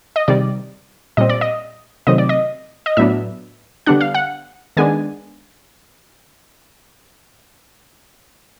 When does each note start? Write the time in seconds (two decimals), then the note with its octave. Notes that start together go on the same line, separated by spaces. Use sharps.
0.16 D#5
0.28 C3 D#3 G3 D5
1.17 A#2 G3 C4 D#5
1.29 D5
1.41 D#5
2.07 C3 D#3 F#3 A3 C4 D#5
2.18 D5
2.29 D#5
2.86 D#5
2.97 A2 F#3 B3 D4 E5
3.86 D3 G3 B3 D4 F#5
4.01 F5
4.14 F#5
4.77 D#3 G#3 B3 D4 G#5